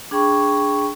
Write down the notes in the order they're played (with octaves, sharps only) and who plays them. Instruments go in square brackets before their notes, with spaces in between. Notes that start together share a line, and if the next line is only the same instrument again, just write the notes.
[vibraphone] D4 G#4 G5 B5 C#6